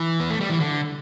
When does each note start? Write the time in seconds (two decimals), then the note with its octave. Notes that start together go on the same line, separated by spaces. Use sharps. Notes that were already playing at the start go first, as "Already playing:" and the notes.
Already playing: E3
0.20 B3
0.30 A3
0.40 G3
0.50 E3
0.60 D3